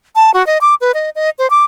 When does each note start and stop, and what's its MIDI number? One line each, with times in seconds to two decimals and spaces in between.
0.16 0.31 81
0.34 0.45 66
0.47 0.58 75
0.61 0.75 86
0.81 0.92 71
0.94 1.10 75
1.15 1.30 75
1.39 1.49 72
1.50 1.65 86